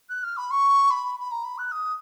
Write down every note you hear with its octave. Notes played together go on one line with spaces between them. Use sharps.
F#6
F6
B5
C#6
B5
B5
A#5
B5
F#6
D#6